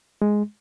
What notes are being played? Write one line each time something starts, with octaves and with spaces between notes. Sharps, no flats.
G#3